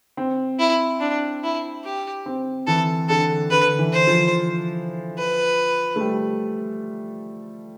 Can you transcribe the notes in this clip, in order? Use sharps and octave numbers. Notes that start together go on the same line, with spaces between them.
C4
E4
D4
E4
G4
C4
E3 A4
D3 A4
D3 B4
E3
C5
F3
B4
A3
G3